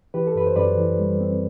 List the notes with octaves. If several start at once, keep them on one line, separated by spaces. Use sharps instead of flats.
E3 G4 B4
A4
F#2 B4
C5
F#2 B4 D5
E3
G3
C4